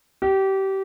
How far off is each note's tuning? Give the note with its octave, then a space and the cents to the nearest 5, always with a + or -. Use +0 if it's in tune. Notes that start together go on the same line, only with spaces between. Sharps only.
G4 -25